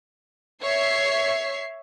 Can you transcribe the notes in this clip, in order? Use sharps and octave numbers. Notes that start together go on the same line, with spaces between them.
C#5 E5 C7